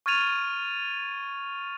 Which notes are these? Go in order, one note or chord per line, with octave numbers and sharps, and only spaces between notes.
C#6 F6 G#6 A6 D#7 F7